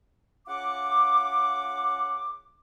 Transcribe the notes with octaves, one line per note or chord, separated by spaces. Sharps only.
C#3 F4 F#5 D6